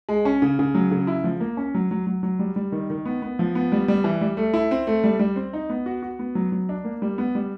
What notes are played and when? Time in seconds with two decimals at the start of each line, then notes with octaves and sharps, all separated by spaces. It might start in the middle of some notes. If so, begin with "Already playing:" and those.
0.09 G#3
0.25 C#4
0.42 C#3
0.59 C#3
0.75 F#3
0.91 C#3
1.07 E4
1.24 F3
1.40 A#3
1.57 C#4
1.74 F#3
1.91 F#3
2.07 F#3
2.23 F#3
2.39 G3
2.56 G3
2.72 D#3
2.90 D#3
3.06 B3
3.22 B3
3.39 F3
3.55 B3
3.72 G3
3.88 G3
4.04 E3
4.21 G3
4.37 A3
4.54 E4
4.71 C4
4.87 A3
5.04 G3
5.19 G3
5.36 C4
5.53 D#4
5.70 B3
5.86 F#4
6.03 F#4
6.19 B3
6.35 F#3
6.52 F#3
6.69 D4
6.84 A#3
7.02 G3
7.18 B3
7.35 G3